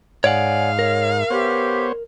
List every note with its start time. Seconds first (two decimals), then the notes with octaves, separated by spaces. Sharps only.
0.24 G#2 C#5 D5 F5 F#5 G#5
0.79 A#4 C#5
1.31 B3 G4 C5 C#5